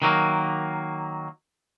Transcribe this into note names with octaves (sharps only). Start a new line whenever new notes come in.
D#3 F#3 A#3